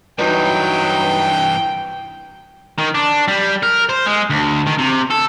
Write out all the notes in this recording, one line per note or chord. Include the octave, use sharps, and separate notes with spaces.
G2 E3 F#3 D#4 B4 G5
D#3
D4
G3
A#4
C5
G#3
D2
D#3
C3
A4